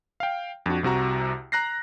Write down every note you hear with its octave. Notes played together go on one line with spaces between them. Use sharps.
F5 G5
F2 D4 F#4
C2 C3 F#4 A#5
A#5 F#6 A#6 C7